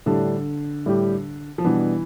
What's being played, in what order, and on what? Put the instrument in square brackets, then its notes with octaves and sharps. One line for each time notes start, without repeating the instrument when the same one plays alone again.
[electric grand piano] A2 G3 D4 G4 [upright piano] D3
[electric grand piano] A2 G3 D4 G4
[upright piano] F3
[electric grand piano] B2 G3 B3 D4 [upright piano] E3